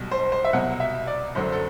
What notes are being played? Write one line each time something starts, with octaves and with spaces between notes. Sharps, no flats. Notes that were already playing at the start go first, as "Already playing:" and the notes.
Already playing: B1 B2 G3
C5
C5
E5
C2 B2 F#3 F#5
E5
D5
G1 F#2 D3 F#3 C5
A4